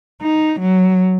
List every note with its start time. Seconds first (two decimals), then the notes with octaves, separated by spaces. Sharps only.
0.22 D#4
0.60 F#3